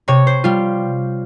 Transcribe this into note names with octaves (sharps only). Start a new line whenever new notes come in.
C3 C#5
C5
G3 F4